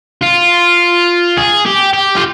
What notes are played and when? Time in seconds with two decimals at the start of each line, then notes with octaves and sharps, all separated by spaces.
0.23 F4
1.37 G#4
1.65 G4
1.93 G4
2.17 F4